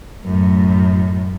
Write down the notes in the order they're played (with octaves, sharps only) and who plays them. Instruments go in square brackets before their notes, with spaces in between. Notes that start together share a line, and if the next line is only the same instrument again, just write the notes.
[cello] F#2 A2